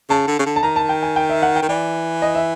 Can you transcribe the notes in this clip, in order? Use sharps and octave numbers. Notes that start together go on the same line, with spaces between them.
C#3 A5
D3
C#3
D3
A5
D#3 A#5
A5
G5
G#5
G5
E5
F#5
G5
D#3
E3 D5
D#5
E5